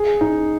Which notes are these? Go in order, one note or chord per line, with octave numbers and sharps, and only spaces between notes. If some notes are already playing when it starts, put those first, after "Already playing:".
Already playing: G#4
D#4